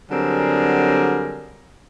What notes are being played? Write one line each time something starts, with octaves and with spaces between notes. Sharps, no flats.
D3 F#3 G3 C4 G#4 A#4